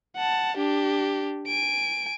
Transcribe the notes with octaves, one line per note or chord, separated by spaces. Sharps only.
F#5 A5
D4 G4
G#5 D7